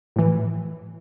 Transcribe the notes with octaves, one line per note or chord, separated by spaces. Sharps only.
A2 E3